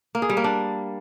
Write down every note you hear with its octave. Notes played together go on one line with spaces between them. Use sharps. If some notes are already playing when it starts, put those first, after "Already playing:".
A#3
G#4
G3
A#3
D4